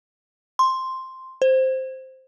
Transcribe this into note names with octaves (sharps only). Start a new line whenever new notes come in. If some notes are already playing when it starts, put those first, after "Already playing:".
C6
C5